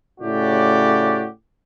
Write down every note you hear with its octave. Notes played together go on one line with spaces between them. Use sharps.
A2 C#3 A3 F#4 G4 D5